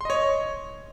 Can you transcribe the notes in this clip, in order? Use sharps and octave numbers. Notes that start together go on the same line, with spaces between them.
C#5 D#5 C6